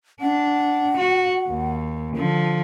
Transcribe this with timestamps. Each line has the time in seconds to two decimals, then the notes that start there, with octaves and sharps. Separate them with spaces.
0.21 D4 F#5
0.97 F#4
1.49 D#2
2.16 D3 F3